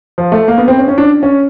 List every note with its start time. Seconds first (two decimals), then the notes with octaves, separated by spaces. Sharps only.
0.18 F3
0.32 A3
0.48 A#3
0.58 B3
0.68 C4
0.78 C#4
0.88 C#4
0.98 D4
1.23 C#4